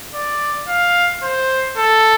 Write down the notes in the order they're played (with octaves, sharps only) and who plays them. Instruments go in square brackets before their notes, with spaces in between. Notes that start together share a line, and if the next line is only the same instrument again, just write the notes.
[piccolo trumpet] D5
F5
C5
A4